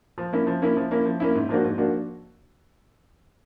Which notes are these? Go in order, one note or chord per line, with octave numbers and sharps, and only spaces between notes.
F3
A#3 C#4 E4
F3
A#3 C#4 E4
F3
A#3 C#4 E4
F3
A#3 C#4 E4
G#2
F3 A#3 D4 F#4
G#2
F3 A#3 D4 F#4